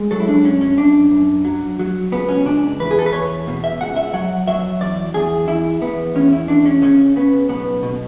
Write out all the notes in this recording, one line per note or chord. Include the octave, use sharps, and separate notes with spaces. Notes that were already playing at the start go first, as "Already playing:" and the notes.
Already playing: G#3
F#3 A4
E4
D4
F#2 C#4
C#4
F#2 D4
F#2
F#3
F#3
C#2 B3
C#4
C#2 D4
E2 B4
G#4
A4
B4
E2 C#5
B2
E5
C#2 F#5
E5
F#3 F#5
F#3 E5
E2 D5
E2 G#4
E2 E4
E2 B3
E2 C#4
E4
E2 D4
C#4
C#3 C#4
C#3 B3
B1 B3
B2